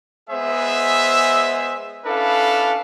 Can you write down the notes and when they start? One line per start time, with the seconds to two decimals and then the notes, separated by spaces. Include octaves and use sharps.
0.30 G#3 B3 G#4 C5 E5
2.06 C#4 D4 E4 A4 B4 F5